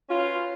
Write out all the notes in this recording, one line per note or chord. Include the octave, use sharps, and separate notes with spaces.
C#4 F4 B4